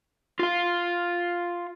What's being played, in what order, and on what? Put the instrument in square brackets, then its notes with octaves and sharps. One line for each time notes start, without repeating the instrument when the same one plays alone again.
[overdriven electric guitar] F4 F5